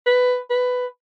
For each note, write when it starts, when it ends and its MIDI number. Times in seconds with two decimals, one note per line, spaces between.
0.06 0.38 71
0.50 0.86 71